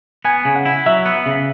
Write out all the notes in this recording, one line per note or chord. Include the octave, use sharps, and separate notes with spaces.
B3 G#5
C#3
F#5
E4
F#3 E5
B3
C#3